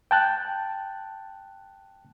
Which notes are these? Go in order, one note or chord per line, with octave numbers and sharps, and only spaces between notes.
G5 A5 F#6